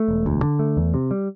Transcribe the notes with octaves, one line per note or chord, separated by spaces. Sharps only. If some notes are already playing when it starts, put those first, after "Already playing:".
Already playing: A3
E1
D2
D3
A3
E2
C3
G3